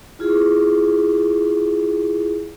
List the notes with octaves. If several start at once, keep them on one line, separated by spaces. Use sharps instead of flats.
E4 F4 G#4